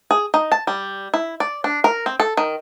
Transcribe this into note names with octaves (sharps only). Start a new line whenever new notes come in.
G#4
D#4
A5
G3
E4
D5
D4
A#4
C4
A4
D#3